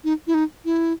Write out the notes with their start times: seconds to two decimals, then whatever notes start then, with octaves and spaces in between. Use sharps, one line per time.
0.04 D#4
0.27 E4
0.34 D#4
0.65 E4